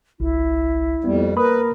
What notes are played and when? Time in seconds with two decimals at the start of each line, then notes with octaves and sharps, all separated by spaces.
0.20 G1 C2 E4
1.04 F2 G3 A#3 B3
1.36 A#3 A#4 B4 B5 D#6